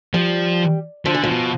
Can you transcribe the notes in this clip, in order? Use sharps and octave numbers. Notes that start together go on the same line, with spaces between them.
F3 G3
D3 F3
E3
A2 F3
B2